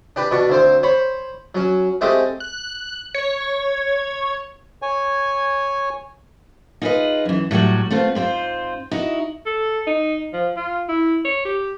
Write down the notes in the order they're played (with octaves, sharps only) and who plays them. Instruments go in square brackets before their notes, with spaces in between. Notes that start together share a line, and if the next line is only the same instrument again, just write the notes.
[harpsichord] D4 G4 B4
B2 D4 C#6
D2 C4 C5
C5 C#5 B5
F#3 C#4
G#3 A3 C4 G4 G#4
[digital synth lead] F#6
C#5
[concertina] C#5 G#5
[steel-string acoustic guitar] D#4 F4 G#4 A4 B4 D#5
F#2 E3
A2 F#3 G3 F#4
A3 B3 C4 F4
G#2 C4 F4 C5
D#4 E4 F#4 D#5
[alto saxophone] A4
D#4
F3
F4
E4
C#5
G4